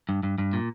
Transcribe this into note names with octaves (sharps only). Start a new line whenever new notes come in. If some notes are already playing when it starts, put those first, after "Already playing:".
G2
G2
G2
A#2